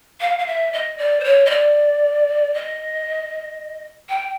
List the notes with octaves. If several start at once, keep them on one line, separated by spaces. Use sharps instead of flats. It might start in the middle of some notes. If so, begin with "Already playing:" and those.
F5
F5
E5
D#5
D5
C5
C#5
D#5
D5
D#5
G5